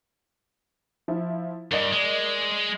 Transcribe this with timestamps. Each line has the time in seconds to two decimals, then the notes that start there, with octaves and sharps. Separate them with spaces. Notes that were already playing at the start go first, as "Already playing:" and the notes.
1.08 F3 E4
1.71 G2 A#4 D5 D#5
1.92 G#3